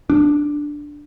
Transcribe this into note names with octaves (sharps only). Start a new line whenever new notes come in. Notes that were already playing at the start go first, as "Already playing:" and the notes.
D4